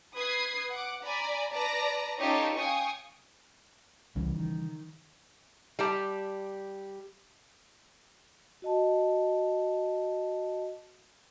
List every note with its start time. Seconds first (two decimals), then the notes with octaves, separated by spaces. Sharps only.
0.17 B4 D#6 G#6 C7
0.72 F#5 D6
1.05 D5 G#5 A#5 B5
1.54 B4 D5 A5 A#5 A#6
2.20 C#4 D#4 F4 G4 A4 C#5
2.58 F5 G5 G#5 C#6 D#6
4.16 C2 C#3 E3 G3
4.35 D#3
5.79 G3 G4 A5
8.62 F#4 D#5 A5